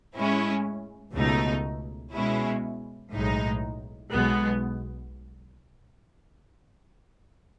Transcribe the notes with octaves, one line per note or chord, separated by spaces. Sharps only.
A2 G#3 C#4 E4
C#2 B2 A3 D#4
B2 G#3 C#4 E4
B1 A2 G#3 D#4
B1 B2 G#3 B3